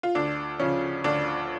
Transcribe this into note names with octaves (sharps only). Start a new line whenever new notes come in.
F4
D2 D4
C#3 F3 C#4
D2 D4